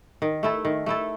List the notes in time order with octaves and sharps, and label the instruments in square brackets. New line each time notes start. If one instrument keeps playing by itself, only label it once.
[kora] D#3
A3 E4 A4
D#3
A3 E4 A4